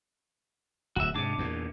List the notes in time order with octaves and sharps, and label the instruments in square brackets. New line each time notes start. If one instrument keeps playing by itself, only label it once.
[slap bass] D1 [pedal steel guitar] F#4 E5
[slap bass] G#2 C3 [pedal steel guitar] D4 D6
[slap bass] E2 A#2